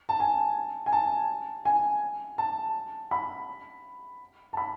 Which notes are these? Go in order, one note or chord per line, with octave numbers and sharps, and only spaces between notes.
A5
G#5
G#5
A5
G#5
A5
B5
A5
B5